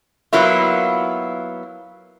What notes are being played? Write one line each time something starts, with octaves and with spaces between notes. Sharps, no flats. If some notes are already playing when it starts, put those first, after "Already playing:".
F#3 A#3 B3 E4 F4